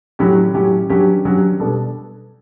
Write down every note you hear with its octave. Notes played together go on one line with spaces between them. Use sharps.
A2 F#3 C#4 G4
A2 F#3 C#4 G4
G2 F#3 C#4 G4
G2 F#3 C#4 G4
B2 G3 D4 A4